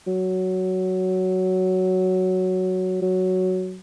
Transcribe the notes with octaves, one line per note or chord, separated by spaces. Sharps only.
F#3
F#3